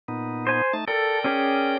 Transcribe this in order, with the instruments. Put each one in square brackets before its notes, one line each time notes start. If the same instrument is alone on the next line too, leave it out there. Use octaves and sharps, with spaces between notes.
[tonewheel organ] A#2 B3 D#4
[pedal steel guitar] C5 G#5
[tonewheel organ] A3 D#4 A5
[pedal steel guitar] A4 [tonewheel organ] A#4 D5 G5
[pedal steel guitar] C#4 G4 G#4